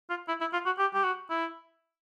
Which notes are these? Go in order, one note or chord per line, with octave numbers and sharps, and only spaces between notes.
F4
E4
E4
F4
F#4
G4
G4
F#4
E4